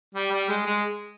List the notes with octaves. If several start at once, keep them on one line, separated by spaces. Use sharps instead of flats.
G3
G3
G#3
G#3